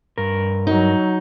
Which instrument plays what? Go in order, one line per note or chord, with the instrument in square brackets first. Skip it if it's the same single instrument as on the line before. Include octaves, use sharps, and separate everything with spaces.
[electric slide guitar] G2 A#4
[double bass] F#3 [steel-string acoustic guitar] D#4